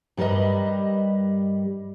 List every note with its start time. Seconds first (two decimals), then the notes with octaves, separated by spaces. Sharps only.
0.17 G2 G3 A#4 B4 D#5